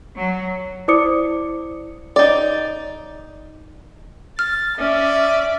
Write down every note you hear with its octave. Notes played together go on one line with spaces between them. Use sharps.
F#3
E4 C5 D5 D6 D#6 C#7
D#4 D5
F6 A6
C#4 D5 E5